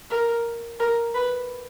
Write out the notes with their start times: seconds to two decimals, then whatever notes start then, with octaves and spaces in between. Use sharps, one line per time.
0.10 A#4
0.80 A#4
1.14 B4